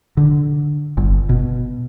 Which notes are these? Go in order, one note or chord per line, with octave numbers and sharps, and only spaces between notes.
D3
G1
B2